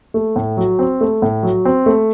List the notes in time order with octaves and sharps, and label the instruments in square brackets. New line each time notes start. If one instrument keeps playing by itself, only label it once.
[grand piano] A3
A2
F#3
C4
A3
A2
F#3
C4
A3